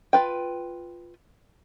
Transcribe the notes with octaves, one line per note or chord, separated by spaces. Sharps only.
F4 B4 G5